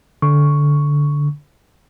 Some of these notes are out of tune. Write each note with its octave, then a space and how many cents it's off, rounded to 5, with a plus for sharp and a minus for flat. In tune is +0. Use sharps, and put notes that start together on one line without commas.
D3 -10 C#6 +0